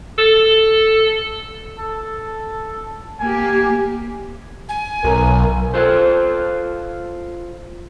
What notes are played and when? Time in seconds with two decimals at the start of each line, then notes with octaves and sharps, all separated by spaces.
0.18 A4
1.79 A4
3.20 A#3 G4 G#5
4.69 G#5
5.04 B1 A#4
5.74 F4 A4 C5